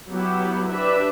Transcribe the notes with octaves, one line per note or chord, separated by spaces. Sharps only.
F#3 B3 E4 G4
D4 G4 B4 E5